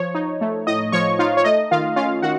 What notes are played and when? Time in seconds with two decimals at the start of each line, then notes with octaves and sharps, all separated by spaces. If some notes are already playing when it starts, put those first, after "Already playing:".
Already playing: F3 C#5
0.15 D#4
0.41 A3
0.67 A2 D#5
0.92 F3 C#5 C#6
1.19 D#4 F4 F5
1.37 C#5
1.44 A3 D#5
1.71 D#3 F4 F5
1.96 C#4 F4 F5
2.22 D#3 F#4 F#5